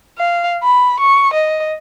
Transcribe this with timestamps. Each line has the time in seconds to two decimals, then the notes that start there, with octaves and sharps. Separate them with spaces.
0.18 F5
0.63 B5
1.00 C#6
1.34 D#5